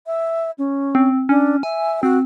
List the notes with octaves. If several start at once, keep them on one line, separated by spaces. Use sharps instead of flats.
E5
C#4
C4
C#4 D4
E5 G#5
C4 F#4